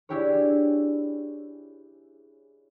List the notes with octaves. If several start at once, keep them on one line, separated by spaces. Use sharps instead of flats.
D4 E4 G4 G#4 C#5